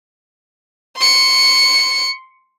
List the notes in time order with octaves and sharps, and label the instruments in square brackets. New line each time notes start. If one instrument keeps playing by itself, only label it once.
[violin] C6 C#7